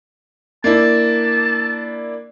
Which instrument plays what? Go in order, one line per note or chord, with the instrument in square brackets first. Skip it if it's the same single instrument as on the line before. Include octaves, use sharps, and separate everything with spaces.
[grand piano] A#3 D4 E4 [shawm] A5